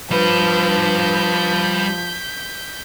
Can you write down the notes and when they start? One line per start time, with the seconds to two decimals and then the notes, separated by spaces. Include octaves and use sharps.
0.11 F3 G3 B4 G6 B6